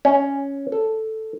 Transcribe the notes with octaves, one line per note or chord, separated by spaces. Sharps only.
C#4
A4